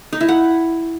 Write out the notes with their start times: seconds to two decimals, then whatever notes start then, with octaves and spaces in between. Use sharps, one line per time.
0.13 D#4
0.21 E4
0.28 F#5